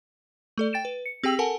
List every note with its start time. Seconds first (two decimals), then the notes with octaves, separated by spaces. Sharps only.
0.58 A3 A4 D5
0.73 G5 A6 D7 E7
0.85 B4
1.06 C#7
1.23 C4 G4 G#4 G5 E6 F#7
1.39 A4 A#4 F#5 G#5 A5